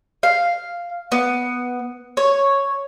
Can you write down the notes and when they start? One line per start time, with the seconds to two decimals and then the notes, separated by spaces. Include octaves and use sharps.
0.23 F5
1.12 B3
2.17 C#5